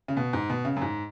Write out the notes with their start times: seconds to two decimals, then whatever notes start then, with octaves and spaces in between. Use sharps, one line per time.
0.08 C#3
0.17 B2
0.33 G#2
0.50 B2
0.65 C#3
0.76 F#2
0.82 G#2